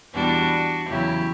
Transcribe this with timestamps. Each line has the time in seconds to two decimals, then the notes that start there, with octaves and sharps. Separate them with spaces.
0.14 E2 B2 G3 D4 F#4
0.88 E2 C#3 F#3 E4 G4